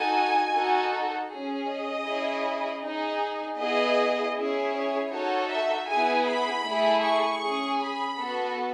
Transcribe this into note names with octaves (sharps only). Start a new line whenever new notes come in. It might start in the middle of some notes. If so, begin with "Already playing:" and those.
Already playing: D#4 F#4 A4 G#5
D#4 F#4 A4
C#4 G#4
D#5
C#4 E4 G#4
D#4 G#4
B3 E4 G#4 D#5
C#4 E4 G#4
C#5
D#4 F#4 A4 C#5
E5
B3 E4 G#4 G#5
B5
A3 E4 G#4
C#6
C#4 G#4
B5
B3 F#4 A4